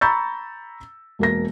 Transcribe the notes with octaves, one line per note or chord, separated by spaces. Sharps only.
A#5 B5 C#6 E6 G6 A6
E1 A#3 A#6